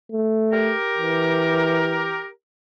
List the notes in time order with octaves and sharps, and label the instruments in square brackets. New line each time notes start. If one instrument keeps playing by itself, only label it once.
[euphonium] A3
[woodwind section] G4 A#4
[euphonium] E3